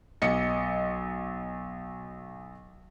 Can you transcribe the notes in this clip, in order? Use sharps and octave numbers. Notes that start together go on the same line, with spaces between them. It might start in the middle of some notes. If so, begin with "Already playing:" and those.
B1 D#5 C#7